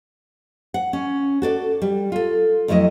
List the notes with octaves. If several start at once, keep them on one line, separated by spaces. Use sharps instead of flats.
F#5
C#4
F#4 A4 D5
G3
F4 A4
F2 F#3 A3 E4 D#5